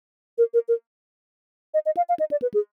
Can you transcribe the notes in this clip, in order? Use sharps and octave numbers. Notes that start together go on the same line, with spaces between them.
A#4
A#4
A#4
D#5
D#5
F5
F5
D#5
D5
B4
G#4